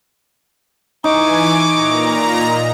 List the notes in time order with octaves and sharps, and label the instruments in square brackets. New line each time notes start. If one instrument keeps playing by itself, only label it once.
[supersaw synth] E3 G#5 [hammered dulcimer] D#4 [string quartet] C#6 D6
[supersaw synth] A#2 A#5